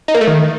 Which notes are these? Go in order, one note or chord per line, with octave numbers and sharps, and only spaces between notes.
D#4
A#3
A3
D#3